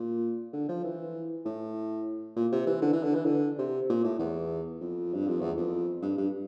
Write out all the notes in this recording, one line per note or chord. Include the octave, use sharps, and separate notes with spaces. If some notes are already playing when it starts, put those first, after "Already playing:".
Already playing: A#2
D3
F3
E3
A2
A#2
C3
E3
D3
E3
D3
E3
D3
C3
A#2
A2
E2
F2
G2
F2
E2
F2
G2
G2